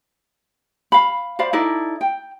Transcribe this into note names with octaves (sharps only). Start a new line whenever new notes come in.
F5 B5
C5 D5 F5 B5
D#4 E4 A4 D5
G5